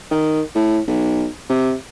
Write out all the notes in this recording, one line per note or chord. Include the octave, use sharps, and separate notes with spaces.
D#3
A2
B1
C3